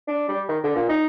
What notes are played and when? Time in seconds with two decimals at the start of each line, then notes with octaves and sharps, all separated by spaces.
0.07 D4
0.28 G3
0.48 D#3
0.64 D3
0.75 A#2
0.89 D#4